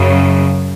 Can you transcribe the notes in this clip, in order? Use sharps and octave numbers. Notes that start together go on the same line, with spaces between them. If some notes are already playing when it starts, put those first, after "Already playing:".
Already playing: F#2 C#3 F#3